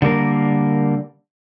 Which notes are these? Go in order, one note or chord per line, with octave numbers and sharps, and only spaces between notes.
D3 G3 A#3 A#4